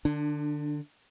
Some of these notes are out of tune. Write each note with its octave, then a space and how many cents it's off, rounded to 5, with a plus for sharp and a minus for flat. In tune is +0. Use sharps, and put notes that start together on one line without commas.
D3 +30 D4 +0